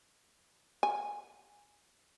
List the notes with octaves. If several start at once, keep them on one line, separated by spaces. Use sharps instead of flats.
G#5